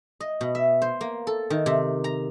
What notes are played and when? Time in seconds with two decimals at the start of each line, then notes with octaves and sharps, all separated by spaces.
0.20 D#5
0.41 B2
0.55 E5
0.82 C5
1.01 A#3
1.27 A4
1.50 D#3
1.66 C3
2.04 A#5